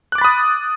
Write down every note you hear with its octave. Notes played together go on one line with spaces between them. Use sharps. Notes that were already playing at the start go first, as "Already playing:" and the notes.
B5 D6 D#6 F#6 A6